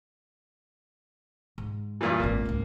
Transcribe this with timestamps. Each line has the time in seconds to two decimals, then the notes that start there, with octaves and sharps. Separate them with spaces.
1.58 G#2
2.01 G2 A#2 E3
2.20 D1 G#1 A#3
2.45 C#2 G#2